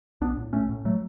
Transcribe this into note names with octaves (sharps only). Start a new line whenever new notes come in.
B1 B3 D4
A2
B1 A3 C#4
A2
F#3 A3